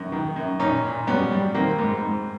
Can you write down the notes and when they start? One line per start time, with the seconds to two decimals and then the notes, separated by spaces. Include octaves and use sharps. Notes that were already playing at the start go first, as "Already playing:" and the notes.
Already playing: F#2 D#3
0.12 D#3
0.36 F#2
0.60 A#2 C#4 D#4
0.84 A#2
1.07 G3 B3 C#4
1.31 G3
1.54 D#3 A#3 C4
1.78 G#2
2.02 G#2